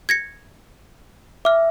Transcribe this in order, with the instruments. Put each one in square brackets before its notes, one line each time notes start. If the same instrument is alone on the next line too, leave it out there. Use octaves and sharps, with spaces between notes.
[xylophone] G#6 A#6 C#7
[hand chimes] E5 [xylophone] D6 F6